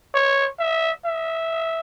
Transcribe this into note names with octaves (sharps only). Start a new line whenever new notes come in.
C#5
E5
E5